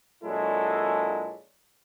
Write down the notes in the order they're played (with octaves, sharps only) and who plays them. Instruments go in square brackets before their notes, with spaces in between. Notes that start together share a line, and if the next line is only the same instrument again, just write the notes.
[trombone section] A#2 F#3 G#3 D4 E4 A4